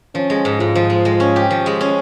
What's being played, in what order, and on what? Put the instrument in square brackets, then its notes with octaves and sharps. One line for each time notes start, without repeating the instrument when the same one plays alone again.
[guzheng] F3 [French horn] C#4
[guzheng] G#3
G#2
[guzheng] G#2 [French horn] F4
[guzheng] F3
G#3
G#3
C#4
G4
F3
G#3
C#4